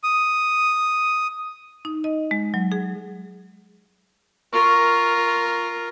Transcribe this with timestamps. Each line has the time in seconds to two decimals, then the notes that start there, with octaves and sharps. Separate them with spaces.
0.03 D#6
1.85 D#4
2.04 D#5
2.31 G#3
2.54 F#3
2.72 G#4
4.53 F4 A#4 C#6